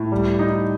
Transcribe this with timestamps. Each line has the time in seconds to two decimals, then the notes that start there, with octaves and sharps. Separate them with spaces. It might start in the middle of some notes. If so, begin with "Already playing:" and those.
Already playing: A2
0.12 G3
0.39 D#4